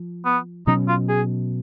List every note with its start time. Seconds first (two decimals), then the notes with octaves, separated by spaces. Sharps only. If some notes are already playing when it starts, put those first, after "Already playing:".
Already playing: F3
0.25 B3
0.67 B2 F#3 C#4 D#4
0.88 F4
1.09 G#4